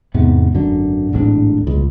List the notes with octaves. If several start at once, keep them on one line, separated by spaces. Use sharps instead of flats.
E2 G#2 C3 B3
G#1 F#2 D3
D1 A1 G#2 D4
D#1 C#2